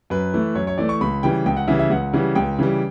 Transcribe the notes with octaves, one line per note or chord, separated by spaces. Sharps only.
F#2 B4
E3 A3
F#2 C#5
C#5
E3 A3 D5
C#6
C#2 B5
C#3 E3 G3 G5
C#2 G5
F#5
C#3 E3 G3 E5
E5
C#2 F#5
C#3 E3 G3
C#2 G5
C#3 E3 G3